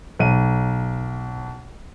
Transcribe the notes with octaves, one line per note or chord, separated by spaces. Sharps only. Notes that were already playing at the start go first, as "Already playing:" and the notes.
B1 D#7